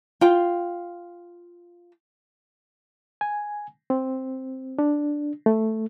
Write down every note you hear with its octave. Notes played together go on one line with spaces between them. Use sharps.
F4 G5
G#5
C4
D4
A3